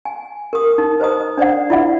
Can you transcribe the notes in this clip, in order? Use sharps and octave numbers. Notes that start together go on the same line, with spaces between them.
G#5
A#4 D#6
D#4
B4 C5 D#5 A#5 D#6
D4 C5 D5 F#5
E4 F4 D5 E5 F#5